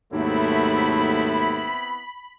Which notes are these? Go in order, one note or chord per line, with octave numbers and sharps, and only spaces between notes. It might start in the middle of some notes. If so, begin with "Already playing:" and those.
D#2 G#2 F#3 A3 B3 C4 E4 B5